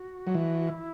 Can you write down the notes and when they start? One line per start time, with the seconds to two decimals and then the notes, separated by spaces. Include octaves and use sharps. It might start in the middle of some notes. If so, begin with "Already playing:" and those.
Already playing: F#4
0.27 F#3
0.35 E3
0.68 E4